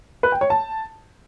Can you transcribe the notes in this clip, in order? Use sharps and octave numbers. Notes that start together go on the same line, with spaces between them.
B4
G5
C#5
A5